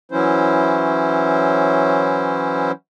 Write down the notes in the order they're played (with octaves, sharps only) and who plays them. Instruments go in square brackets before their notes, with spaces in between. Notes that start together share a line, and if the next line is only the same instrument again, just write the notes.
[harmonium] E3 F#3 C#4 E4 C5